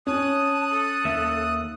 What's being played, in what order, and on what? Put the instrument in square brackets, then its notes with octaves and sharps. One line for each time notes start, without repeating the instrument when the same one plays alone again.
[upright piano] C#4 [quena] A5 [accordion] D#6 F#6
[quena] A4
[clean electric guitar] D#2 A#3 E5